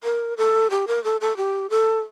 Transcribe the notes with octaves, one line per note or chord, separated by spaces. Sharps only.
A#4
A4
G4
A#4
A4
A4
G4
A4